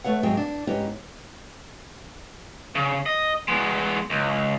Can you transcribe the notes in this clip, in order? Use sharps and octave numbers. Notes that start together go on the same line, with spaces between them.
A3 B4 C#5 F#5
G#2 C3 F#3 G#3 G#4 G5
D4
G#2 B3 C#4 D#4 G4
C#3
D#5
G#3 B3
C#2